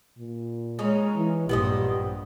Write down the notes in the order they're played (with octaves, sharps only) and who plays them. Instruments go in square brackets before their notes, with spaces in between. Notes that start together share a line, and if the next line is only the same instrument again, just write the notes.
[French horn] A#2
[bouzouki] C#3 C#4 D#4 [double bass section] G#3
[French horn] E3
[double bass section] A#1 G2 [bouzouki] B3 C4 D#5 [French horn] G4